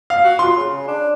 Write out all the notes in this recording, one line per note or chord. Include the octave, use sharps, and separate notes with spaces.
F5
F#4
F4 C6
C#3
D4